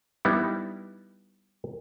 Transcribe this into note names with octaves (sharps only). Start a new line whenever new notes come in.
G3 B3 D#4 E4